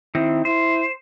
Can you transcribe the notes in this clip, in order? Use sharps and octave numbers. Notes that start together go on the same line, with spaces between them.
D#3 C4 E4
E4 C5